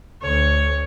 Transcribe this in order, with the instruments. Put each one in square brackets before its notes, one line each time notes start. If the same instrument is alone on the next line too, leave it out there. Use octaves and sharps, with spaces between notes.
[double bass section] D2 [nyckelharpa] C#5